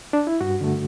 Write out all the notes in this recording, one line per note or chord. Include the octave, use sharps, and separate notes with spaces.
D4
E4
G2 F#4
D3 A3